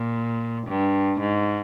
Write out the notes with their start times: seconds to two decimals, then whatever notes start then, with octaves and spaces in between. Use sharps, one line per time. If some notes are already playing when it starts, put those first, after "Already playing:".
Already playing: A#2
0.67 G2
1.20 G#2